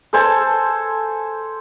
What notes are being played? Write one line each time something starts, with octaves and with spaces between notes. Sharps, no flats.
A4 C5 G#5 A5